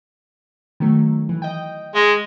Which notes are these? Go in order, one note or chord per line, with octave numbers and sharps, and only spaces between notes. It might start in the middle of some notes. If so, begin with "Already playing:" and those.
D#3 F#3 A3
E3
D#5 G5
G#3 D#5